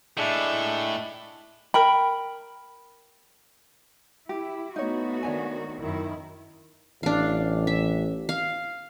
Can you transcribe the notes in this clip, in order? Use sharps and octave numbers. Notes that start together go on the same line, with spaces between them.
A2 G#3 D4 E5
A#4 G5 B5
E4 G4
A3 B3 D#4 F#4 C#5
D#3 D4 C#5 G#5
F#2 D#3 E4
A1 D4 F5
E5
F5